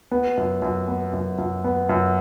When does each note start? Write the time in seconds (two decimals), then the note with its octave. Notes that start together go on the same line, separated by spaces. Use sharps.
0.11 B3
0.37 F#2
0.62 F#2
0.88 B3
1.13 F#2
1.38 F#2
1.64 B3
1.89 F#2